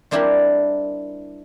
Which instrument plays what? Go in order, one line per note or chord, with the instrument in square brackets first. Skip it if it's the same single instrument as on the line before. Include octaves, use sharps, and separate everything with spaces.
[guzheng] G3 C4 D4 E4 G4 A#4